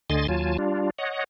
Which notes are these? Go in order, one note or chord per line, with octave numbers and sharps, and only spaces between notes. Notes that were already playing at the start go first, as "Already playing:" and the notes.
D2 D3 D#5 G#5 C6 A6
D#2 F#3 F4 G#5 A5
G3 D4 F4
C#5 D#5 F#5